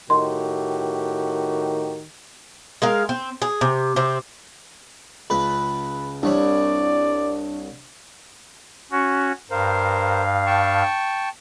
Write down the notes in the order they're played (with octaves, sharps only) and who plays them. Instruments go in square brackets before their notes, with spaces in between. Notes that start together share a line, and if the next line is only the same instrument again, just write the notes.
[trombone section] A2 F#4 G4 [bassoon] D#3 [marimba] D#5 C6
[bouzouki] G#3 A#4 F5
C4
G#4
C3
C3 C4
[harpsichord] C#2 B4 [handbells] B5
[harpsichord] C2 C#5 B5 [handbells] D4 [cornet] D5
[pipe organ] C#4 F#4
[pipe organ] G2 F5 [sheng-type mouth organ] A#4 C5
[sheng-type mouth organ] G5 A5 C#6